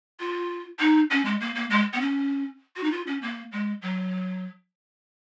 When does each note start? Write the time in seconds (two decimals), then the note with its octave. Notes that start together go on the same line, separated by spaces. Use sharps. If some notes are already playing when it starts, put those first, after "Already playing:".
0.20 F4
0.79 D#4
1.10 C#4
1.25 G#3
1.41 A#3
1.55 A#3
1.70 G#3
1.93 B3
2.00 C#4
2.76 F#4
2.84 D#4
2.91 F4
3.07 C#4
3.22 A#3
3.52 G#3
3.82 F#3